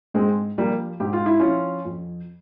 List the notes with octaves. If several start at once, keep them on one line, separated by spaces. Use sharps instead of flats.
G#2 G#3 C4
F3 G3 A#3
G#2 G4
F4
E4
F3 C#4 F4
F2